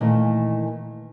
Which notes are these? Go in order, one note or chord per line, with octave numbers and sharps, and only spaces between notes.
A#2 D#3 E3 A3 A#3